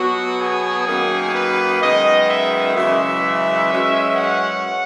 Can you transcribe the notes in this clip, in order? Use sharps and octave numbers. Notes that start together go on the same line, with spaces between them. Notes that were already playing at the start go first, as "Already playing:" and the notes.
Already playing: B2 F#3 B3 F#4
G#4
F#2 D#3 A#3
B4
F#2 D#3 G#3 B3 D#5
E5
F#2 C#3 E3 G#3 E5
F#2 E3 G#3 C#4
F#5